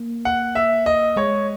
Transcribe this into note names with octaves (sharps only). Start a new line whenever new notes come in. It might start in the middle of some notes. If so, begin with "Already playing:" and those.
Already playing: A#3
F#5
E5
D#5
G#3 C#5